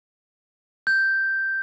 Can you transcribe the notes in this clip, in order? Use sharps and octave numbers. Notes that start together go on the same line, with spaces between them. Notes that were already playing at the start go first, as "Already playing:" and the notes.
G6